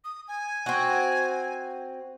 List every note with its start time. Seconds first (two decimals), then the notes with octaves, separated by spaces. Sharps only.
0.05 D#6
0.28 G#5
0.66 C4 F#4